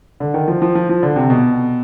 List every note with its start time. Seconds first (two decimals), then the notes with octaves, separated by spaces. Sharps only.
0.20 D3
0.34 D#3
0.48 F3
0.62 F3
0.75 F3
0.89 F3
1.03 D3
1.16 C3
1.30 B2